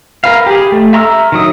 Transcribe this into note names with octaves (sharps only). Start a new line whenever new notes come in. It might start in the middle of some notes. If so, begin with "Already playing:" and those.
A#4 B4 F5
G4 G#4
A3
E5 A#5 C6 E6 F6
D#3 F#3 D#6